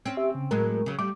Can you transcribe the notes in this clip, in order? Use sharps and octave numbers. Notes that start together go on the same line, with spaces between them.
C4 C#4
G4 E5
C#3
A2 F#3 G#3 A#4
C#3 F#3
G3 A3 D6